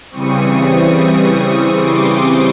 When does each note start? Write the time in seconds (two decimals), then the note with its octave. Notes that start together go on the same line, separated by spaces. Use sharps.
0.10 C#3 E3 G3 C4 C#6 D#6
1.78 C6 D6